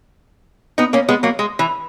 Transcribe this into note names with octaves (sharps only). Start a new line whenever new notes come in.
B3 D#4
A#3 C#4
G#3 B3
F#3 A#3
G#3
E3